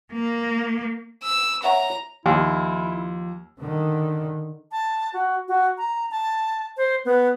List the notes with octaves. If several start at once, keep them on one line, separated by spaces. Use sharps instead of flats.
A#3
E6
C#5 E5 F#5 A#5
D#2 F3 E4 C6
D3 D#3
A5
F#4
F#4
A#5
A5
C5
B3